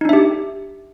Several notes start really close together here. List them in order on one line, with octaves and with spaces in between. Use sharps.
D#4 D4 E5 G4